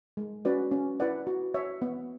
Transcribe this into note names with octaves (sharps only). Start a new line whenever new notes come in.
G#3
C#4 F#4 B4 D5
C#4
E4 B4 D5 F#5
F#4
C#5 E5
B3